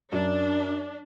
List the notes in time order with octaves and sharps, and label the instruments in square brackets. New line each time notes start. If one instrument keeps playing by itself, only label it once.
[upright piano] F#2 [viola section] D4